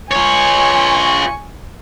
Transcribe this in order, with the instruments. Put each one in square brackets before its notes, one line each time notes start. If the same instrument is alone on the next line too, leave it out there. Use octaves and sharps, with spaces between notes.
[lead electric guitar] F4 C#5 [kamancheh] G#5 C#6